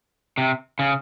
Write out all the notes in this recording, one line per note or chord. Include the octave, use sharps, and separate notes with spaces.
C3
C#3